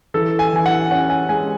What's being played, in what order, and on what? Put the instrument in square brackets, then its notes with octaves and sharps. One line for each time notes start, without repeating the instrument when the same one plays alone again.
[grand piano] E3 A4
G#5
E3 G#5
F#5
C#4 F#5
G#5
G#3 G#5